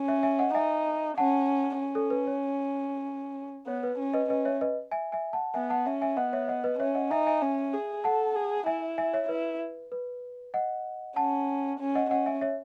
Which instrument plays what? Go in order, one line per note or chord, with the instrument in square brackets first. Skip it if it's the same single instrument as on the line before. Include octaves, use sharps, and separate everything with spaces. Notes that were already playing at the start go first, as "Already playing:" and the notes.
Already playing: [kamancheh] C#4
[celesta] C#5 E5
E5 G#5
D#5 F#5
[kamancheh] D#4 [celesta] E5 G#5
[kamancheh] C#4 [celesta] F#5 A5
[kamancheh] C#4
[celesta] A4
B4
C#5
[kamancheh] B3 [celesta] C#5
[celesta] B4
[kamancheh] C#4
[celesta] B4 D#5
[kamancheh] C#4 [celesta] B4 D#5
[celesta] C#5 E5
B4 D#5
E5 G#5
E5 G#5
F#5 A5
[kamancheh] B3 [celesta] E5 G#5
[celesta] F#5 A5
[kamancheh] C#4 [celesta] E5 G#5
[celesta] E5 G#5
[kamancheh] B3 [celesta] D#5 F#5
[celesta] C#5 E5
D#5 F#5
B4 D#5
[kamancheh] C#4 [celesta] C#5 E5
[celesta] D#5 F#5
[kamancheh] D#4 [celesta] E5 G#5
[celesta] E5 G#5
[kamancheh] C#4
G#4
[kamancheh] A4 [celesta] F#5 A5
[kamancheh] G#4
[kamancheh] E4 [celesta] E5 G#5
[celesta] E5 G#5
C#5 E5
[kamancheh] E4 [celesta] B4
[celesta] B4
D#5 F#5
[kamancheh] C#4 [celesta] F#5 A5
[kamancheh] C#4
[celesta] D#5 F#5
[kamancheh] C#4 [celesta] D#5 F#5
[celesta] E5 G#5
C#5 E5